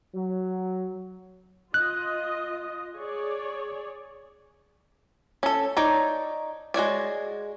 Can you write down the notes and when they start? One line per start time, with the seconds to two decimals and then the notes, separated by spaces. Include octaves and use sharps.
0.14 F#3
1.74 F4 D#5 F#6
2.96 G#4 C#5 D5
5.43 C#4 A4
5.77 D#4 C#5 D5
6.74 G#3 F#4 C#5 D5